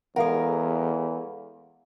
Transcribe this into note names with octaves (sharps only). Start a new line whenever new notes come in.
E2 G#3 A4 A#4 F5 F#5